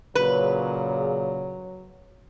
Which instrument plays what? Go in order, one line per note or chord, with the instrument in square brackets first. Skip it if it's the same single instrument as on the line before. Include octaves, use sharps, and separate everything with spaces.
[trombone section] A#2 C#3 [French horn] F#3 [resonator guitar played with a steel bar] B4